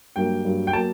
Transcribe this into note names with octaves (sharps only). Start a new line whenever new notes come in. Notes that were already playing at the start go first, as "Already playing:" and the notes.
G2 F#3 A#3 G5
G2 F#3 A#3
G5
F#3 A#3 A5